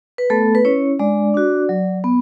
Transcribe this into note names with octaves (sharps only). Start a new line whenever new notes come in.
B4
A3 B3 A4
B4
C#4 E4 C#5
G#3 D4 D5
D4 F#4
F#3
B3